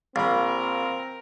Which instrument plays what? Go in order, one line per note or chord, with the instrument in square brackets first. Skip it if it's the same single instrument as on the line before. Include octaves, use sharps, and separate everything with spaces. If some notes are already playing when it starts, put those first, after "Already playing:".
[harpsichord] A#1 [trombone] C4 [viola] A#4 [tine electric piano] F5 B5